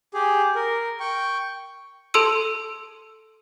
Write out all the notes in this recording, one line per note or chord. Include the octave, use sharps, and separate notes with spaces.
G4 G#4
A#4
G5 C#6
A4 A5 C6 E6 D#7